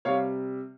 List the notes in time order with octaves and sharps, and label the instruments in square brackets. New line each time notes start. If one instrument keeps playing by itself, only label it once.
[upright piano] C3 G3 C#5 F5